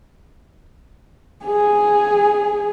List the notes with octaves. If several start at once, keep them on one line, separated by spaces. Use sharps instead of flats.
G#4 G#5